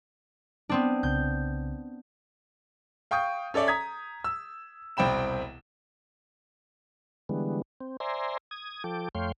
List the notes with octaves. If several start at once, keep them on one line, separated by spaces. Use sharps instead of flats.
B3 C4 D4
C2 C#3 G6
F5 G5 C#6 D#6 G6
C#4 A4 C#5 D5 E5
A#5 D#6 G#6 B6
E6
E1 C2 C4 G5 B5 E7
D3 E3 G3 G#3 B3
C4
C5 D5 E5 G#5 A#5 C6
D#6 G#6
F3 A4 G5 D6
F2 A3 C#5 F5 G5 C6